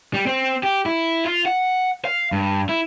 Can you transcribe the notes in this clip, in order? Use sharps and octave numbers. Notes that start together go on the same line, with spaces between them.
G3
C4
G4
E4
F4
F#5
F5
G2
E4